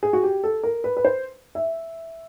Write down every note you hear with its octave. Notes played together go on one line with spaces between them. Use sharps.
G#4
F#4
G4
A4
A#4
B4
B4
C5
E5